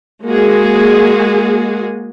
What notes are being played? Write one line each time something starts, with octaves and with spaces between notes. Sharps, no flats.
G#3 A#3 F#4 G#4